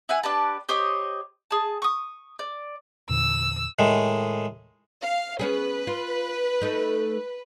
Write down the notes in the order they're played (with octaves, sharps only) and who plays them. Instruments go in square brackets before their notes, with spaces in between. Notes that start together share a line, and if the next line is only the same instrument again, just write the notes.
[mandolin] E4 F#5 G#5
D4 G4 B4 A5
G4 C5 C#5 D#5
G#4 A5
C#6 D#6
D5
[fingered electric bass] E2 A#2 D3 [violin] E6
[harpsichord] A2 D#3 G#3
[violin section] F5
[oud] B3 C#4 G#4 [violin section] B4
[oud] F4
A3 D#4